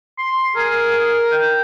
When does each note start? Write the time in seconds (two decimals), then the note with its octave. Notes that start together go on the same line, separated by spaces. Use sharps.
0.18 C6
0.56 G#4 A#4
1.31 G5